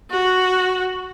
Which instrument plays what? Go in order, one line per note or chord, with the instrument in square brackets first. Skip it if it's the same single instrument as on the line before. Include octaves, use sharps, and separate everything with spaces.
[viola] F#4